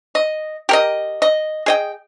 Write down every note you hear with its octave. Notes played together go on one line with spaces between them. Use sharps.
D#5
G4 A#4 D#5
D#5
G#4 D#5 G5